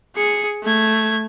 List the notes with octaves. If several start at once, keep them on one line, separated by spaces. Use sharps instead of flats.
G#4 C#7
A3 G#6